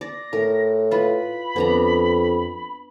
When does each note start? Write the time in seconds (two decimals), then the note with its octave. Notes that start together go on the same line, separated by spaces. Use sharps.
0.01 D5 A#6
0.33 A2 A#4
0.91 F4 B4 B5
1.56 F2 B3 D4 A#5